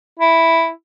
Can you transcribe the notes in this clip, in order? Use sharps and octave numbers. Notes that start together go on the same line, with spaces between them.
E4